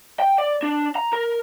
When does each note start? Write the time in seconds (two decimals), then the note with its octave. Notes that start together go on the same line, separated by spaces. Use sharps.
0.20 G5
0.38 D5
0.62 D4
0.96 A#5
1.13 A#4